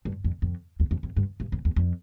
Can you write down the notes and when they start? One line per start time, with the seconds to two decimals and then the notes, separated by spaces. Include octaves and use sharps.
0.05 G2
0.24 F2
0.42 F2
0.80 E2
0.91 F2
1.03 F2
1.17 G2
1.40 G2
1.52 F2
1.65 E2
1.76 F2